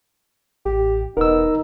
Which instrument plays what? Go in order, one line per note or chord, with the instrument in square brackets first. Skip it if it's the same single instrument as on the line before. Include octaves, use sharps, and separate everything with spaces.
[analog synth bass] A1 [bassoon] G4
[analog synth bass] E1 [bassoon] B3 [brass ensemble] D#4 [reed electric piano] A#4 E6